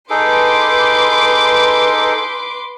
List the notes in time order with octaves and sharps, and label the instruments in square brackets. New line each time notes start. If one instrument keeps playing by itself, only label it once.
[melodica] D#4 G#4 A4 [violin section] B4 C6 D6